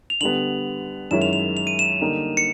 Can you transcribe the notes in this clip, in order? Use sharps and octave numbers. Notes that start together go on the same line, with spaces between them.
F7
D3 G3 B3 F#7
F#2 D#3 G#3 C#4 E4 E7
F7
F7
F7
D#7
E7
D3 G3 A#3 D#4 G4
C#7